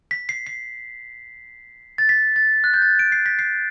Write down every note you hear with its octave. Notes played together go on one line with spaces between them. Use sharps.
B6
C7
C7
A6
B6
A6
F#6
G6
A6
D7
C7
B6
C7